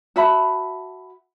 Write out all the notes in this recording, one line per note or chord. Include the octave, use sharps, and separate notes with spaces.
F#4 E5 A5 B5